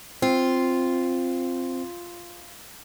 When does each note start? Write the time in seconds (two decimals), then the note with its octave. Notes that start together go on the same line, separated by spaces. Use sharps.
0.22 C4 F4